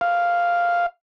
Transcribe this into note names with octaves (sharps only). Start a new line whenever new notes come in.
F5